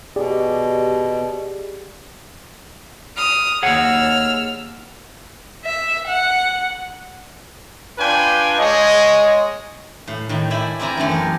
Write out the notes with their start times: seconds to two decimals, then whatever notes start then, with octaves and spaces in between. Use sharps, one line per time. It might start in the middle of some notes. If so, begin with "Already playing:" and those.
0.16 B2 G4 G#4 D5
3.15 D#6 F6
3.62 D#2 G#4 C#5 F#5 E6 F6
5.65 E5
6.07 F#5
7.98 D4 F4 B4 G5 G#5
8.59 G#3 C#5 D#5
10.08 A2
10.29 A2 D#3 G5
10.51 E4 D5 E5 G#5 B5
10.79 C4 E4 A#4 D5 G#5 A#5
10.97 F#2 D3 E3 A3 B5
11.09 B3 G4 A#4